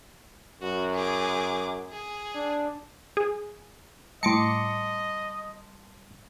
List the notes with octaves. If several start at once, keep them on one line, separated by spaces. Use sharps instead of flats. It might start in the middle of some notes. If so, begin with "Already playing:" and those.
F#2 F#4
G#4 D6
G#4
D4
G#4
A2 G3 D#5 A5 C6 D6 C#7